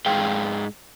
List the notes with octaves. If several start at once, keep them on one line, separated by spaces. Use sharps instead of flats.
G#2 G#4 F5 G5